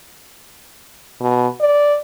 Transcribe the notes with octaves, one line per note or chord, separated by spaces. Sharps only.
B2
D5